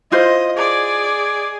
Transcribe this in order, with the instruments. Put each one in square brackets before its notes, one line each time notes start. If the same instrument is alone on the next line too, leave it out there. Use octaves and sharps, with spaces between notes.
[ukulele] E4 F4 C5 [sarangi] D#5
[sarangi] G#4 [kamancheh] D5